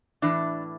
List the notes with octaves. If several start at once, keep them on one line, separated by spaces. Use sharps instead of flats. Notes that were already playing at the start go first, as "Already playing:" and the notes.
A2 E3 D4